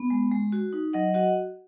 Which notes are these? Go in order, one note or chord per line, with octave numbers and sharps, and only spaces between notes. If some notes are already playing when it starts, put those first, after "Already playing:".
Already playing: B3
G#3
G#3
F#4
D#4
F#3 D#5 F#5
F#4 D#5 F#5